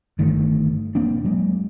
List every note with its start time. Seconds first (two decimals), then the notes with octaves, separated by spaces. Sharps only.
0.19 G1 D#3 A3
0.95 E1 A#3 C4 D4
1.24 F#3 G#3 A#3